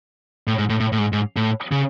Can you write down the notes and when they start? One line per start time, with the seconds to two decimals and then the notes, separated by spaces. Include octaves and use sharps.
0.47 A2
0.58 G#2
0.70 A2
0.80 A2
0.92 A2
0.98 G#2
1.13 G#2
1.36 A2
1.72 C#3